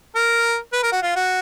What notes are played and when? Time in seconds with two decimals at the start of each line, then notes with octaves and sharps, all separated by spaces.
0.15 A#4
0.73 B4
0.83 A#4
0.92 F#4
1.02 F4
1.16 F#4